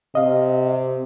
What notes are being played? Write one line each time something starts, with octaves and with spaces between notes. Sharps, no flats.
C3 D#5 F5